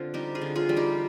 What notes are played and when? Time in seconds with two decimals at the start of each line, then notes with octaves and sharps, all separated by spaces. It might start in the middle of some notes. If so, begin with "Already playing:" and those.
Already playing: D3 C4 F4
0.14 G3 D#4 G4
0.35 F4 G#4
0.42 D3
0.55 F4 G#4
0.69 G3
0.77 D#4 G4